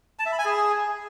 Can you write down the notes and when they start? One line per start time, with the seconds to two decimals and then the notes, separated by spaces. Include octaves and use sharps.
0.19 A5
0.26 E5
0.32 B5
0.39 G#5
0.45 G#4